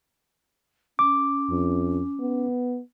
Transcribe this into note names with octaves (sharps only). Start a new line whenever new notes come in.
C#4 D6
F2
B3